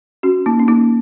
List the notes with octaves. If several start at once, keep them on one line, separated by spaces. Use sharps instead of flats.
C#4 F#4
A#3 D#4
C#4
A#3 D#4